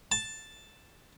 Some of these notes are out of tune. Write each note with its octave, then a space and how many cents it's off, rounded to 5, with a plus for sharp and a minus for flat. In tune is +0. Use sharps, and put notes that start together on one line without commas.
A5 +0